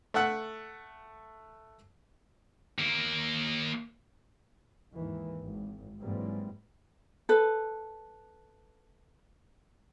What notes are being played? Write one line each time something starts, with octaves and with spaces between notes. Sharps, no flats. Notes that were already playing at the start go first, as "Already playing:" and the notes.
A3 E5 F#5 F#6
D#2 A#3
D#2 G#2 D#3 E3
G#1
G#2 E3 F#3 G3 A#3 C4
A4 B4